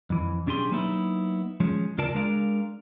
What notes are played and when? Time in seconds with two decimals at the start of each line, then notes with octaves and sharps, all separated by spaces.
0.10 F2 E3
0.46 B1 C#4 D4 G4 G#4 C6
0.71 F#3 A#3 B3 D#4 E4
1.60 F3 G#3 C#4
1.98 D2 C#3 F4 A#4 D5 A5
2.15 G#3 D4 A#4 F5